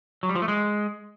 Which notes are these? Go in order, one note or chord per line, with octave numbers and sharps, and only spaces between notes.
F#3
G3
F3
A3
G#3